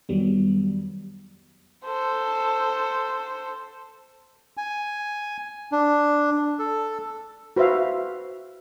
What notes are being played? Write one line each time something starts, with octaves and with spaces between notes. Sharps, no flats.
F2 D#3 F#3 G3 B3
A4 C5
G#5
D4
A4
F#4 B4 C5 E5 F5